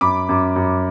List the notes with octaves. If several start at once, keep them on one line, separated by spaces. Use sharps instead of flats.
F#2 B5 D6
F#2
F#2